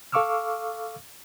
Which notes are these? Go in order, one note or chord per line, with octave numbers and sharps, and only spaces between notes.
A4 F5 C#6 D6 E6 F6